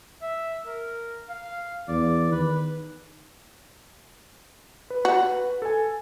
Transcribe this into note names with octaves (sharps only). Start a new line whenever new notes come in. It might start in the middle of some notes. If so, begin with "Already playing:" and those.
E5
A#4
F5
E2 D5
D#3 B4
B4
F#4
A4 G#5